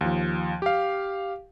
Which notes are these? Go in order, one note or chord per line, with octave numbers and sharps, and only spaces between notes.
D#2 F3
G4 F5